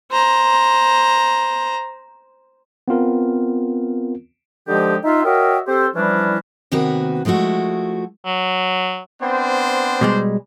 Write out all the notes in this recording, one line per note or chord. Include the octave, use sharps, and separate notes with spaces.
C5 A#5
B3 C4 F4 A#4
D3 F3 G#3 D#4 G4
D#4 F4 E5
F#4 A#4 C#5 D#5 E5 G5
C4 G4 A4 C5
E3 F3 G3 C#4 D4 E4
C3 D#3 A#3 B3 F#4 B4
F3 G#3 A3 E4 F#4
F#3
B3 C4 D4 C5
B2 G3 G#3